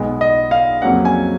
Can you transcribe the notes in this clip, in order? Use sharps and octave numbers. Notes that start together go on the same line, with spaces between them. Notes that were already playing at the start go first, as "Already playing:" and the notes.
Already playing: B1 B2 G#3 B3
D#5
F5
F2 C#3 F#3 A#3 C#4 F#5
G#5